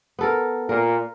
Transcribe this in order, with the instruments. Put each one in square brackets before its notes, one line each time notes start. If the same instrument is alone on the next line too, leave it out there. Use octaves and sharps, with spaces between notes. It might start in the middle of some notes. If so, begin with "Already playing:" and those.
[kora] B3 A4 A#4
[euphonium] A#2 [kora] A#4